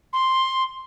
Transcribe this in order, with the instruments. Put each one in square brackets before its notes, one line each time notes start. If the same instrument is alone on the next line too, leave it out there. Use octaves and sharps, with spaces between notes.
[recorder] C6